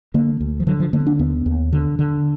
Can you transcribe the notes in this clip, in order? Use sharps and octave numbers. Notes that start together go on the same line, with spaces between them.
D3 A#3
D2
F3
D3 F#3
F3
D3 A#3
B3
D4
D#2 B3
D#2
D3
D3